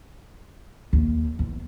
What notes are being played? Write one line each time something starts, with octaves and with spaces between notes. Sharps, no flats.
D#2
E2